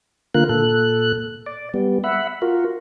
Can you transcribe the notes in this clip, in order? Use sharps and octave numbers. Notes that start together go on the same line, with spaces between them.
D3 A#3 F4 A#4 F#6
A#2 A4 F#6
D5
G3 B3
E5 F#5 B5
F4 F#4 A#4